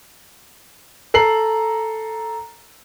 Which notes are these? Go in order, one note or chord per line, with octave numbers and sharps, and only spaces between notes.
A4 A#5 C7 F#7